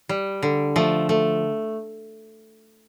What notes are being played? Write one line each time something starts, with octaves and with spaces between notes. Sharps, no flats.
G3
D3
F3 A3
A3